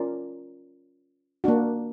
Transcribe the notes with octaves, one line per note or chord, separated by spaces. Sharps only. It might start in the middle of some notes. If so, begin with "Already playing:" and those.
Already playing: C#4 F4 A#4 D5
A#3 D4 F#4